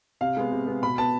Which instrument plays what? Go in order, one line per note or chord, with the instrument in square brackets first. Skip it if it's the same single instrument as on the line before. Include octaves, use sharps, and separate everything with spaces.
[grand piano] C3 F5
G#3 B3
C3
G#3 B3
B2 B5
B3 A5